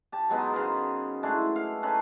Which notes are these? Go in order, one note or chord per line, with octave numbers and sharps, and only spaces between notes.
G4 A5
F#3 G#3 B3 D#4
C#3 B3 A#4 C5
G#3 A3 D4 E4
F5
C#4 D#4 A4 B4